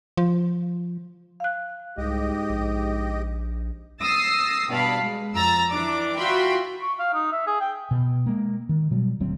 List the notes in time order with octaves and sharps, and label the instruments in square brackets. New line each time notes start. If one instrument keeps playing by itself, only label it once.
[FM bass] F3
[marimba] F5 F#6
[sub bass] C2 [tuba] G#2 [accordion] G4 D#5
[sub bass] A#1
[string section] D#6 E6 A6 A#6 C7
G2 B2 D5 F5 A5 B5
G#3
F2 A#5 E6 A6
E3 D4 D6
F4 F#4 E5 G5 B5 C6
[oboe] C#6
F5
D#4
E5
G#4
G5
[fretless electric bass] B2
G#3 A#3
D#3
B2 F#3 G3
D#1 D2 F#3 C4